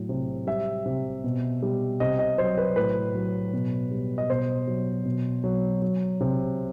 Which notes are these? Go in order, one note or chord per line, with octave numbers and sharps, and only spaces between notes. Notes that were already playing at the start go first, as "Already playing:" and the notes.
Already playing: A2 F#3
C3
G3 E5
C3
B2
G3
C3 D#5
D#5
F#3 C5
B4
A2 B4
F#3
B2
G3
D#5
B2 C5
F#3
B2
F#3
F#3
C3